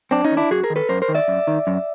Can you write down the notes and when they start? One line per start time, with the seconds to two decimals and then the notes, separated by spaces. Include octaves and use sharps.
0.11 F#2 C4 D4
0.24 C#4 D#4
0.31 D#3
0.37 D4 E4
0.51 F#2 F#4 G#4
0.63 G#4 A#4
0.70 D#3
0.76 A4 B4
0.89 F#2 A#4 C5
1.02 A#4 C5
1.09 D#3
1.14 D5 E5
1.28 F#2
1.47 D#3
1.67 F#2